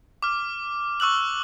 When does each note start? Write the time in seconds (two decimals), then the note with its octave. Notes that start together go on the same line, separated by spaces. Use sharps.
0.23 D6 F6
1.00 C#6 E6 F#6 F#7